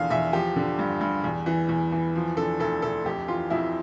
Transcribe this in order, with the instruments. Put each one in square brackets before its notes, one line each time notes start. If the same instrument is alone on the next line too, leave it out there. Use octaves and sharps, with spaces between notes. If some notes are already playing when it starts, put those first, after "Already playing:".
Already playing: [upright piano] E2 D3 F3 F5
E2 E5
F3 G4
D3
G2
G2
E2
E3
E2
E3
F3
D3 A4
D2 A4
D2 A4
F2 G4
E3 F4
F2 E4